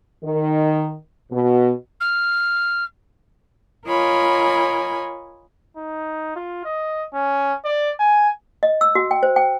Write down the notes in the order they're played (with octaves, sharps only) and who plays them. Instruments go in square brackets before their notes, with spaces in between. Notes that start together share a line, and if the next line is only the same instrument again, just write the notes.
[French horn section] D#3
B2
[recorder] F6
[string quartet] F4 A#4 C#5 D#5 G#5 B5
[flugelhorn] D#4
F4
D#5
C#4
D5
G#5
[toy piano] D#5
E6
F#4
G5
C5
G5